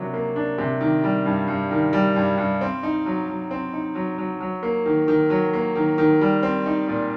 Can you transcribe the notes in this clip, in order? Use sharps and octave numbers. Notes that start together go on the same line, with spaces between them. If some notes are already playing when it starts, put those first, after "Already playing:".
Already playing: C3 F#3 A#3 D4
A#3
D4
C3
D#3
G3
G2
G2
D#3
G3
G2
G2
C4
D#4
F#3
F#3
C4
D#4
F#3
F#3
F#3
A#3
D#3
D#3
F#3
A#3
D#3
D#3
G3
C4
D#4
A#2